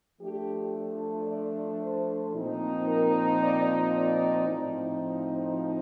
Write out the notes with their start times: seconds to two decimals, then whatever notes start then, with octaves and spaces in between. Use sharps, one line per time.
0.21 F3 A3 D4 G4
1.28 D5
1.82 C5
2.35 A#2 F3 C4 D#4
2.88 A#4
3.42 D5
3.96 D5
4.50 A2 F3 C4 D#4